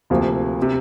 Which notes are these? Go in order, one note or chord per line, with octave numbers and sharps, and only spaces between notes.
D2 C3 F3 A#3
C3